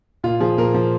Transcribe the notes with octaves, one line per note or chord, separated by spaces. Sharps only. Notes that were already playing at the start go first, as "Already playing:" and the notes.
A#2 F4
F3 G#4
A#2 A#4
F3